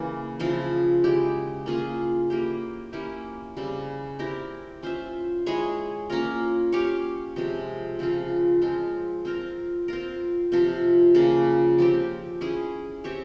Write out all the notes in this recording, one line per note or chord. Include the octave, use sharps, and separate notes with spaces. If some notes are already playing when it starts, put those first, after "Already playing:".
Already playing: C#3 E3 A#3
C#3 F3 C4 E4
G#3 E4 G4
A#3 C#4 F4 G#4
A#3 E4 G4
A#3 C#4 E4 G4
C#3 G3 C4
C4 E4 G4 A#4
C#4 F4 C5 E5
G#3 E4 G#4 C#5
A#3 C#4 F4 A#4
C#4 G4 C#5 F5
C3 F3 G#3 C4
C#3 F3 C4 F4
F3 G#3 C4 F4
C4 F4 A#4
C4 F4 A#4
C3 F3 C4 F4
C#3 F3 A#3
F3 C4 G4
C#4 E4 G#4
C4 G4 C#5 E5